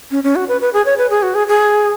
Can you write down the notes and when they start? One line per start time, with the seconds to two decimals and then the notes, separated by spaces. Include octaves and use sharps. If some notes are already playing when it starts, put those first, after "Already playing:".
0.11 C#4
0.24 C#4
0.36 F#4
0.48 B4
0.61 B4
0.73 G#4
0.86 C#5
0.98 B4
1.10 G#4
1.23 F#4
1.35 G#4
1.48 G#4